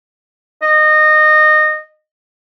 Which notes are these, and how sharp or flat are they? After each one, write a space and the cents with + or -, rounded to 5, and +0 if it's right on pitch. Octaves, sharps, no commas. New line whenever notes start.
D#5 -20